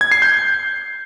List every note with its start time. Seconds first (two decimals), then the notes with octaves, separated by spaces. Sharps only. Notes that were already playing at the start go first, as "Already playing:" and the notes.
0.01 G#6
0.12 C7
0.22 G6